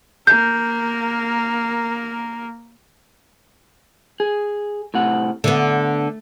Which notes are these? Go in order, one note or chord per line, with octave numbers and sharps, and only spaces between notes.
A#3 A#4 G6
G#4
A2 C3 F#5
D3 A3 B3